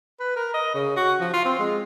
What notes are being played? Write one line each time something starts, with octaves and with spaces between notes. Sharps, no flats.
B4
A#4
D#5
C#3
F#4
F3
F4
C4
G#3